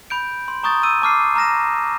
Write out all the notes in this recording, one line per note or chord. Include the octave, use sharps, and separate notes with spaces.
B5 G6 D7
C6
A#5 C#6 D#6 G6 A6
E6 D#7
A5 D6 F6 C7
A#5 F6 A#6 E7